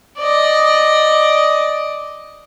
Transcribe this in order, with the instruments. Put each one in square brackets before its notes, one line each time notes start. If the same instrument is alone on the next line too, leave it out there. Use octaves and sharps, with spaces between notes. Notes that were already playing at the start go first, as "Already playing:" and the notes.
[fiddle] D5 D#5